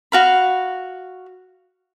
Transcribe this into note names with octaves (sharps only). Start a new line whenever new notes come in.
F#4 F5 B5